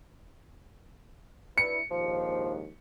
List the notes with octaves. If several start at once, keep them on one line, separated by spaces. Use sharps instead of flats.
D4 E4 B4 C#7
A#1 D#2 G#2 F3